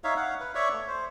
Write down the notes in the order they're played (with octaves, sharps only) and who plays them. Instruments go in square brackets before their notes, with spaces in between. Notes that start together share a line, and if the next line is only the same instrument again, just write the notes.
[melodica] D#4 C#5 E5 F5
F5 F#5
B4
C#5 D5 E5 C#6
A3
C5